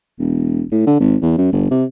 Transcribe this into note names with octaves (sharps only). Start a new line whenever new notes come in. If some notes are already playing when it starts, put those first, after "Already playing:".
E1
A2
D3
G#1
E2
F#2
G1
C3